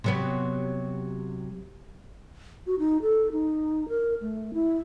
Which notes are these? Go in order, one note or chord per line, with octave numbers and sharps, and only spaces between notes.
C3 F#3 B3
F#4
D#4
A4
D#4
A#4
A3
E4